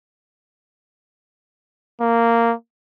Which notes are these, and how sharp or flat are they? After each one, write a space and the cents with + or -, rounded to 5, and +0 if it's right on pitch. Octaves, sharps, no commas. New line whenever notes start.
A#3 -10